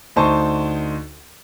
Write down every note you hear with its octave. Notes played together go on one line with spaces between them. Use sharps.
D2 D3 D#4 C5 A5 C#6